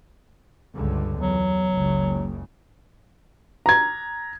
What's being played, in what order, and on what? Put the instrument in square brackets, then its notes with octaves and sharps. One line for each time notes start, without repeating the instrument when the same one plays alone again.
[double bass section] C#2 G2 D3
[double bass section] E2 [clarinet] F#3
[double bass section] F#1 C#2 C#3
[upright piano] A#5 G#6